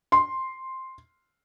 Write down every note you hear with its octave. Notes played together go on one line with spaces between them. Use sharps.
C6